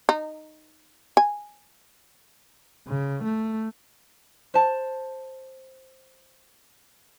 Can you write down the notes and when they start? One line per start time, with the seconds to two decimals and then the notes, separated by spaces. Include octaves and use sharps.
0.09 D#4
1.17 G#5
2.88 C#3
3.24 A3
4.54 C5 A5